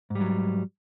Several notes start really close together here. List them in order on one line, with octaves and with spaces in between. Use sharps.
G#2 G3 F#3